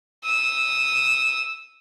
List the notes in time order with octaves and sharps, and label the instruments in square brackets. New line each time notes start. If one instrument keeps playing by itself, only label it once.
[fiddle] D#6 E6